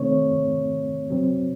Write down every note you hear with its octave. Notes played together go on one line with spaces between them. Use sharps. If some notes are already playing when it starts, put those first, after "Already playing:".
Already playing: C3 D#3 A3 C4 C#5
C3 F#3 C4